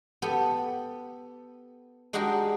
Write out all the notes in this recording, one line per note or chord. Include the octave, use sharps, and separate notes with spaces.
B3 G4 A4
G#3 D4 D#4 F#4 G4 A#4